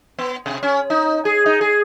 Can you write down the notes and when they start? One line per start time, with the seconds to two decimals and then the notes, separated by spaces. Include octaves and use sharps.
0.19 B3
0.46 C3
0.63 C#4
0.90 D#4
1.25 G#4
1.46 D#4
1.61 G#4